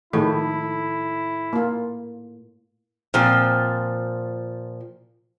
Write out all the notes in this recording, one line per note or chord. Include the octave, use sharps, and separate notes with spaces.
A2 D#3 F3 E4 G#4
A#3 F4
A#2 F3 C4